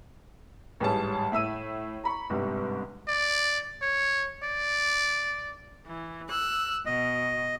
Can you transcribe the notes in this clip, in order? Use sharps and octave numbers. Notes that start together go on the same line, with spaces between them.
A1 G#2 G3 G#4 C#5 A5
A2 E5 E6 D#7
A#5 B5 C#6
G1 G#2 C3 G3
D5
C#5
D5
E3
E6 F#6
B2 D#5